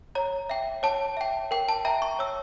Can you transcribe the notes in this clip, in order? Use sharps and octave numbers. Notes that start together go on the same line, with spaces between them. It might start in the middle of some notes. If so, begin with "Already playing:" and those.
C#5 A#5
E5 G5
C#5 A5
E5 G5
A#4 G5
A5
E5 G5 A#5
C#6
C#5 E6